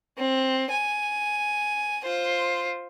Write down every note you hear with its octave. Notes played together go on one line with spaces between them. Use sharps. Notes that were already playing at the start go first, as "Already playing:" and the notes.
C4
G#5
F4 C5